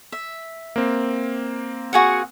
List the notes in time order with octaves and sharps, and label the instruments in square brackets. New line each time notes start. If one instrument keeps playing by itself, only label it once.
[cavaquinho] E5
[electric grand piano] A#3 C4
[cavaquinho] F#4 G#4 F#5